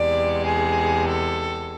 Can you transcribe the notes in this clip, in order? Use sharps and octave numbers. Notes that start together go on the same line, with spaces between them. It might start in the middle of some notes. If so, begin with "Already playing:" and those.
Already playing: E2 C3 G#3 D5
G#4
A4